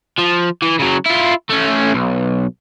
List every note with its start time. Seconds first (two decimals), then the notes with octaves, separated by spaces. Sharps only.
0.18 F3
0.62 E3
0.79 C#3 F#3
1.06 E4 F4
1.49 A3 C#4
1.94 B1